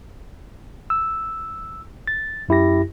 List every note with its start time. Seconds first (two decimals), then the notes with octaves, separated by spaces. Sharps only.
0.90 E6
2.07 A6
2.49 F#2 E4 G4 A#6